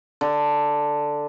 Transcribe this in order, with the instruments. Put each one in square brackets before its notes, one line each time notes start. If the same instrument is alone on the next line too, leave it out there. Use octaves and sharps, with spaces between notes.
[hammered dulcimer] D3